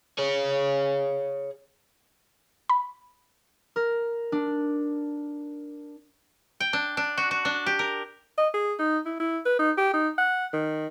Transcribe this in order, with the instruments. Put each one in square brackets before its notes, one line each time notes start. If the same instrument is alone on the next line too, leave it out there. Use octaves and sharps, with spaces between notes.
[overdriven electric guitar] G#4 C#5
[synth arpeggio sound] B5
[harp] A#4
D4
[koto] G5
D4
D4
F#4
F#4
D4
G4
A#4
[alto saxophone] D#5
G#4
D#4
E4
E4
B4
D#4
G4
D#4
F#5
D#3